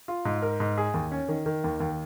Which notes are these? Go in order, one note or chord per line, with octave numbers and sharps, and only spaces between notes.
F4
G#2
A#4
G#2
G#4
D#2
C#4
D#3
D#3
D#2
D#2